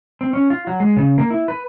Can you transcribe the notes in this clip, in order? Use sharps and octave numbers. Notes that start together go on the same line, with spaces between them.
C4
C#4
F4
F#3
G#3
C#3
A#3
E4
B4